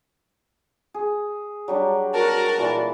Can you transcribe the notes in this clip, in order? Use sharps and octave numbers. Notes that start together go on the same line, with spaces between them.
G#4
F#3 G3 D4
F#4 A#4 A5
A#2 E3